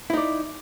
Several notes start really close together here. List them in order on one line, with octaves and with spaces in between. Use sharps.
E4 D#4 D5